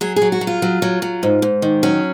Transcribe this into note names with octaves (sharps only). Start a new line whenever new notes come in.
F#3 G#4
G#4
F#3
F#4
F#3
F4
F#3
F#3
F#3
G#2
G#2
D#3
F#3 C#4